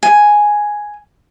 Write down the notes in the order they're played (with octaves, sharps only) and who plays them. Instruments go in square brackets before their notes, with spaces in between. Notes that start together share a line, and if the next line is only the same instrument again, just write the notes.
[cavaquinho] G#5